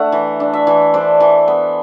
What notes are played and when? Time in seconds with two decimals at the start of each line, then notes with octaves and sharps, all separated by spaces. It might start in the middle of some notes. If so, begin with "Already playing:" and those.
Already playing: A3 D4 F#5
0.12 E3
0.40 D4
0.53 E5
0.67 E3
0.94 D4 C5
1.20 E3
1.48 B3